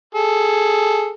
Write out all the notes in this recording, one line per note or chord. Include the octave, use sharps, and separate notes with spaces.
G#4 A4